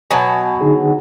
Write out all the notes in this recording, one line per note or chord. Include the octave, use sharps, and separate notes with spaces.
B2 F#3 G#5 A5
D3 D#4 G#4